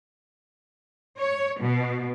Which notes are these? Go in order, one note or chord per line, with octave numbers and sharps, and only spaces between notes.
C#5
B2